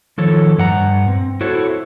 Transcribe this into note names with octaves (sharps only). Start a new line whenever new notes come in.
D#3 F3 A4 C#5
G2 F#5 A#5
C4
E4 F#4 A4 C5 C#5